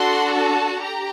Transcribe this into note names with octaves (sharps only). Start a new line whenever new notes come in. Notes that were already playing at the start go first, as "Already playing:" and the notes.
Already playing: D4 F#4 A4 C6
A5
G4 A#5